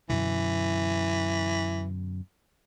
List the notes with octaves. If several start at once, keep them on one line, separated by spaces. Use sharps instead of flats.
F#2 B2 D3 E3